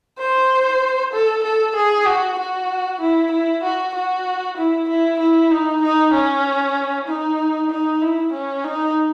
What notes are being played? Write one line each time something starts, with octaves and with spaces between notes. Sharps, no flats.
C5
A4
A4
G#4
F#4
F#4
E4
E4
F#4
F#4
E4
E4
E4
D#4
D#4
C#4
D#4
D#4
E4
C#4
D#4